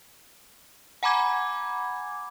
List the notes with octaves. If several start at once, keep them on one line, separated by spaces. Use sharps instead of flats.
F#5 G#5 A#5 B5 D6 G#6